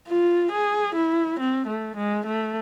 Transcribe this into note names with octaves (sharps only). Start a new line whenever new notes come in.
F4
G#4
E4
C4
A3
G#3
A3